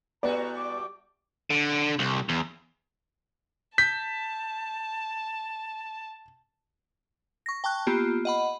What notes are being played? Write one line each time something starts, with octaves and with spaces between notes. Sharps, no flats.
A2 G3 B3 F#4 D5 A#5
D6
D3
C2
E2
A5 G6 B6
C#6 A#6
G5 A5 C#6 F#6
A#3 B3 F4 G4
D#5 F#5 B5